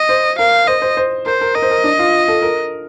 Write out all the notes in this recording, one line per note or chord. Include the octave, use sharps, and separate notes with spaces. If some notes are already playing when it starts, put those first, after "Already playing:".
Already playing: D#5
C5
A#4 F5
C5 D#5
C5
C5
A#4 C5
A#4
A#4 D#5
C5
A#4
D4
F4
A4
A#4